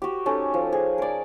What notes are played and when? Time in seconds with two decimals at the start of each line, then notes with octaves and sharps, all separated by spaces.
0.02 F#4 G4
0.26 C#4 D#4 A4
0.54 F3
0.72 G#4
0.98 A#4 D5